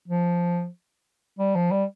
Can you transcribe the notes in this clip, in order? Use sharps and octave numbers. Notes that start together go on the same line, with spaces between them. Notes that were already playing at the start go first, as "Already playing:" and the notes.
F3
G3
F3
G3